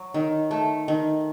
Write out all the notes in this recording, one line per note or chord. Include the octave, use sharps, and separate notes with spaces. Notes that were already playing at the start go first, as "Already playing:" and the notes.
Already playing: F#3
D#3
A3
D#3